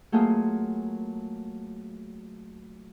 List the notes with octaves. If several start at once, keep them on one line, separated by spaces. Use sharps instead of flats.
F#3 A3 A#3 F4 G#4